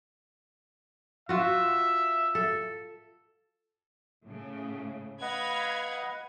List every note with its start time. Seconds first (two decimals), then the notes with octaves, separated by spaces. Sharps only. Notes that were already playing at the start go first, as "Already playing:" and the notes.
1.29 F4 F#4 E5
2.35 A4
4.25 A2 C#3
5.22 B4 D#5 F5 F#5 B5 G#6